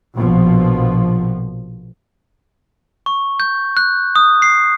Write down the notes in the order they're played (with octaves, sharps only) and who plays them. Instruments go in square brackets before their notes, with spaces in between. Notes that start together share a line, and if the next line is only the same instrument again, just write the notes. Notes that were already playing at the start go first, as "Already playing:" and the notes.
[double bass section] A#1 B2 F3
[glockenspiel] C#6
G6
F#6
D#6
C7